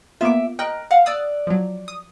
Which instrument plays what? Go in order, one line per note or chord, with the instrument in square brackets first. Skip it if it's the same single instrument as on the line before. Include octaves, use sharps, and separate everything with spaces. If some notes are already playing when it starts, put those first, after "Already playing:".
[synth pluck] A#3 B3 F4 [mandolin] E5 D6
[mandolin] A#4 F#6 [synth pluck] D#5 G5
[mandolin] F5 [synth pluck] F#5
[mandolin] D5 F#6 [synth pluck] D#6 E6 A6
[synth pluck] F3 F#3
D#6